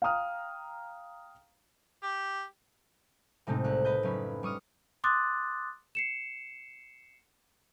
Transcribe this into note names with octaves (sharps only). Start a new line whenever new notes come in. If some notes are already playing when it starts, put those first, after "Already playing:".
F5 G5 A#5 D#6 F6
G4
A2 C3 G#3 A3 C4 D#4
C2 F#6
B4 D#5 G6
F#1 C#4 B5
G3 C#6 D#6 F6
C6 D6 D#6 F#6 A6
C7 C#7 E7